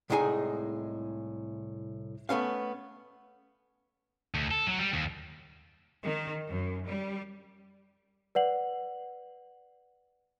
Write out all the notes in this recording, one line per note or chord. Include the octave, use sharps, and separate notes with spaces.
C2 A2 G#3 D#4 G#4 G#5
A3 B3 C#4 F5
D2
A4
F#3
G3
D#2
D#3
F#2
G3
B4 D5 F#5 F#7